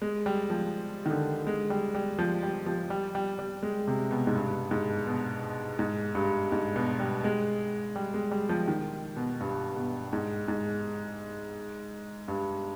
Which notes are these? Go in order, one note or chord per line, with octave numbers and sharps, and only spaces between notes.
G#3
G3
F3
D#3
D3
G#3
G3
G3
F3
G3
F3
G3
G3
G3
G#3
C3
B2
G#2
G2
G#2
B2
G#2
G2
G#2
B2
G3
G#3
G3
G#3
G3
F3
D#3
B2
G2
B2
G#2
G#2
G2